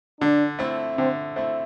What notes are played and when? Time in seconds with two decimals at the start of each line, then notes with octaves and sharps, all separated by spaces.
0.21 D3 D4
0.59 A3 C4 E4
0.97 D3 C4
1.36 A3 C4 E4